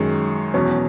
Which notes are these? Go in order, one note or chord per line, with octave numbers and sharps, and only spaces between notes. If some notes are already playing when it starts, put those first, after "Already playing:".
Already playing: F#2 D#3 G#3
E2 B2 F#3 C#4